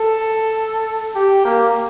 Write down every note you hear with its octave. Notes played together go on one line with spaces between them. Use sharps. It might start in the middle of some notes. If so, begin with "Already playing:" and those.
Already playing: A4
G4
A#3